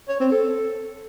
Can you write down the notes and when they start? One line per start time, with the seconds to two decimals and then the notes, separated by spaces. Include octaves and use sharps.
0.09 C#5
0.20 C4
0.32 A4